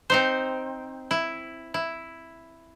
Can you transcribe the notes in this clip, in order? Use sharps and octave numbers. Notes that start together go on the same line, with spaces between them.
C4 D#4 C5
E4
E4